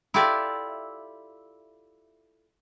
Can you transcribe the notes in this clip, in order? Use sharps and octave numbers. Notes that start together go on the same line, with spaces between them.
E4 F4 G4 A4 D5 E5